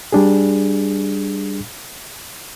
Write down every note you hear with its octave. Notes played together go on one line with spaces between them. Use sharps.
G3 D4 G#4